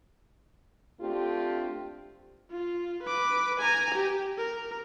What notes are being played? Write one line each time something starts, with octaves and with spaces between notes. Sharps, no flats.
A3 C4 D4 F4 G4
F4
B4 D6
G#5 A#5
G4
A#4